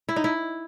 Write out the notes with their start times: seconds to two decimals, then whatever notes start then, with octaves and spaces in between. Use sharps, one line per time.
0.09 E4
0.16 D#4
0.24 E4